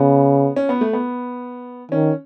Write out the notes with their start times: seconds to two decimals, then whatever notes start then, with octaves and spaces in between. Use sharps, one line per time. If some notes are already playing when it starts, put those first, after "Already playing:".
Already playing: C#3 B3
0.56 C#4
0.69 B3
0.81 A3
0.93 B3
1.91 D#3 C#4